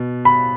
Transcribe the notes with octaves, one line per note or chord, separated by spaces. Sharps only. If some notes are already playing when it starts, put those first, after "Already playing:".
Already playing: B2
B5